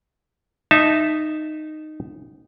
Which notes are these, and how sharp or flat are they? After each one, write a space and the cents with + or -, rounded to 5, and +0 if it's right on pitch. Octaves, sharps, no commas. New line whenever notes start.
D#4 -10 E5 +0 A5 +0